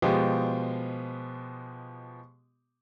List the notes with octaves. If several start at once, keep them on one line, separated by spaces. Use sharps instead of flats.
B2 F3 G#3 B3 G4